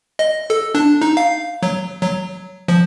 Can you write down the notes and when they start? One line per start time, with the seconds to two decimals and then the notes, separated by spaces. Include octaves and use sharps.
0.19 D#5
0.50 A4
0.75 D4
1.02 D#4
1.17 F5
1.63 F#3
2.02 F#3
2.68 F3